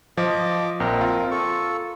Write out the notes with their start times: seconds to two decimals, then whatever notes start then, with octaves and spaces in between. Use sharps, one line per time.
0.17 F3 D#5 D6
0.80 A#1 C4 A#4
1.01 F4
1.31 A4 C#6